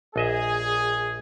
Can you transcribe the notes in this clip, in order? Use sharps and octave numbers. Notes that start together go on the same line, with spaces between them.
A#1 G#4 D#5 E5